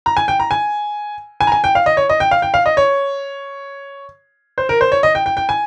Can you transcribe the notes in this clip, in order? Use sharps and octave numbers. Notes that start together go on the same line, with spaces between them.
A#5
G#5
G5
A#5
G#5
G#5
A#5
G#5
G5
F5
D#5
C#5
D#5
G5
F5
G5
F5
D#5
C#5
C5
A#4
C5
C#5
D#5
G5
G5
G5
G#5